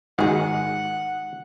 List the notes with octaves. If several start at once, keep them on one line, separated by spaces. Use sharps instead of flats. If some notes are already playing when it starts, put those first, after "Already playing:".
G#2 D#3 G#3 F#4 G#4 F#5